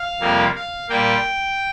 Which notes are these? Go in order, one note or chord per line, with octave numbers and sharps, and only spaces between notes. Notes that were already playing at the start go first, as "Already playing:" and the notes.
Already playing: F5
F2 C3 G3 A#3
F5
A#2 G3 A#3 G5